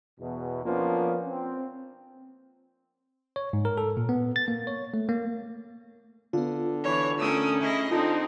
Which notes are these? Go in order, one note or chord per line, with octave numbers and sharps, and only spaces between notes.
E2 B2
F3 A#3 B3 C#4 D4 F4
C4
C#5
G#2
A#4
A4
A#2
B3
A6
A#3
C#5
A3
A#3
D3 B3 F4
E3 C#5
A3 C#4 A#4 D#6 E6
E4 G#4 D#5
D3 C4 D#4 F4 A4 A5